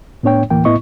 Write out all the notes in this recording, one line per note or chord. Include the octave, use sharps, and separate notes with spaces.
A2 B3 D4 C#5 G5
D2 A2 E3 A#3 G5
A2 B3 E4 D#5 C#6